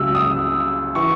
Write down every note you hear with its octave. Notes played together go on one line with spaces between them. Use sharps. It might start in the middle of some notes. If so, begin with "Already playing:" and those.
Already playing: C#2 C#3 F#3 E6
D#6
E3 C#6